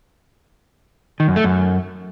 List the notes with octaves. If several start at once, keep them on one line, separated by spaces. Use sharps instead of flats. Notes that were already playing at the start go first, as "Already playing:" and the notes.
D#3
F#2
A3
F#2